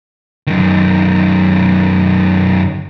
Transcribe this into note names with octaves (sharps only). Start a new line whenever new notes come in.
F#2 D#3